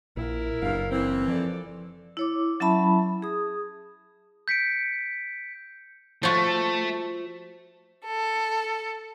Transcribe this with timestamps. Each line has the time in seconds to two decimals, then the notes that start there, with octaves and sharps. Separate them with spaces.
0.17 A#1 E4 A#4
0.62 F#1 G2 F5
0.90 E3 C4
1.28 F3 A4 D5
2.17 E4 C#5 D6
2.60 F#3 C#4 E4 E5 A5 B5
3.22 G#4 D#6
4.48 G6 B6 C#7 D7
6.23 F3 A3 F4 F#4
8.05 A4